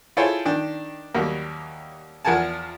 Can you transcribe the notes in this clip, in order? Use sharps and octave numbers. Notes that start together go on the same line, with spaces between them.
E4 F4 G#4 A4 C5 C#5
D#3 D4 G5
D#2 F#3 G3 A#3
E2 F3 A#4 F#5 G#5 A5